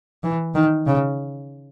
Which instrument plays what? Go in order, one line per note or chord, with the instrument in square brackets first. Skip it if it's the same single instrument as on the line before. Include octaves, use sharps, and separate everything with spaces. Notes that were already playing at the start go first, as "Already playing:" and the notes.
[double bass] E3
D#3
C#3